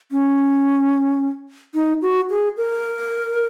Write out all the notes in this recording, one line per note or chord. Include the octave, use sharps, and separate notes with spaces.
C#4
D#4
F#4
G#4
A#4